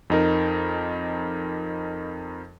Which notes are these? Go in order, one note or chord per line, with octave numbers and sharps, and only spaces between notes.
F2 D#4 A#4